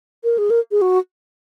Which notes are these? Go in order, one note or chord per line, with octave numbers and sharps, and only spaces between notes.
A#4
G#4
A#4
G#4
F#4